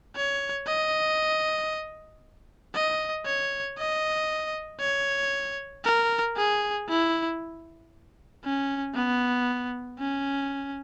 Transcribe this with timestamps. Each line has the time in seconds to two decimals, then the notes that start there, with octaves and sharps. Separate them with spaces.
0.16 C#5
0.67 D#5
2.75 D#5
3.26 C#5
3.78 D#5
4.81 C#5
5.84 A#4
6.37 G#4
6.89 E4
8.44 C#4
8.95 B3
9.99 C#4